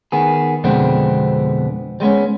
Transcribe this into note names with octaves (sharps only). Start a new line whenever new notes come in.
D#3 B3 G#4
F2 B2 D3 G#3 B3 C4
G3 G#3 B3 C#4